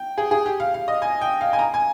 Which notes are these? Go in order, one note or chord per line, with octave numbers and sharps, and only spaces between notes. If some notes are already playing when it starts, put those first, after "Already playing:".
Already playing: G5
G#4
G#4
G4
F5
F5
D#5
G#5
G5
F5
G#5
A#5
G#5